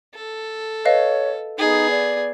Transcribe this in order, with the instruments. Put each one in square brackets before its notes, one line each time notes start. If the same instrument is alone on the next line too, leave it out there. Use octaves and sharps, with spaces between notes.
[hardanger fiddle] A4
[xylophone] B4 D#5 F5 [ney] C#5
[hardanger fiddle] B3 G#4 [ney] D#4
[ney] D5